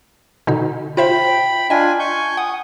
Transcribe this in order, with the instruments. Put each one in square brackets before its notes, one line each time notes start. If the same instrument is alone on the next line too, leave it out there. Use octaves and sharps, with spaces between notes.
[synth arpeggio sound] B2 D3 D#4
[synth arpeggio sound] F4 C5 E5 [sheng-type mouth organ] G5 B5
[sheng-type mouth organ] D4 F4 G#5 [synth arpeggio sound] D#5 G5
[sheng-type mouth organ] G#5 C#6 G6
[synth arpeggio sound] F#5 [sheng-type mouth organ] D#6